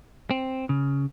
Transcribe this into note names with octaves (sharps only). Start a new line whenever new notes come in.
C4
C#3